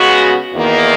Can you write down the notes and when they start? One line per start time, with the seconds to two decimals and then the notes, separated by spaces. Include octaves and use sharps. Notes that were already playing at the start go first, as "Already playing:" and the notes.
Already playing: C#3 G#3 B3 F#4
0.54 E2 D#3 A#3